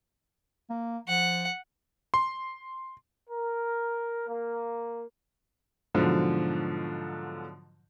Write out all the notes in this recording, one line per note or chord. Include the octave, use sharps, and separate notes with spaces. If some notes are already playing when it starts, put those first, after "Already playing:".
A#3
F3 F#5
C6
A#4
A#3
G#2 B2 D3 F3 F#3